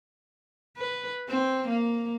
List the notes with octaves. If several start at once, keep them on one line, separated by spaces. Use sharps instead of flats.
B4
C4
A#3